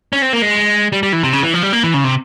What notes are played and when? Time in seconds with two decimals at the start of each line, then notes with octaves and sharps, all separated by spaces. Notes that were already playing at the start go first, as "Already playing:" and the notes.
0.13 C#4
0.22 C4
0.33 A#3
0.42 G#3
0.92 G3
1.03 G3
1.13 E3
1.23 C3
1.33 C#3
1.43 E3
1.54 F3
1.63 G3
1.73 A#3
1.84 E3
1.94 C#3
2.04 C3